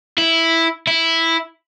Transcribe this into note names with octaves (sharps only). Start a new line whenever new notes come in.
E4
E4